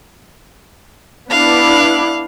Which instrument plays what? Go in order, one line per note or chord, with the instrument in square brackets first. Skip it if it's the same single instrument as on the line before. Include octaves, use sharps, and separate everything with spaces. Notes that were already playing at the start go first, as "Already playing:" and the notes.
[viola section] B3 D4 E4 [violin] F5 F#6